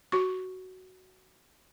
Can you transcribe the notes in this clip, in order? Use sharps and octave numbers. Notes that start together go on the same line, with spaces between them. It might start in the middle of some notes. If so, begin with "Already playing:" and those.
F#4 C#6